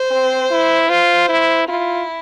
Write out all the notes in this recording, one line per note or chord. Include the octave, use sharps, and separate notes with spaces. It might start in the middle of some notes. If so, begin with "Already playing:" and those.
Already playing: C5
C4
E4
F4 C5
E4
E4 F4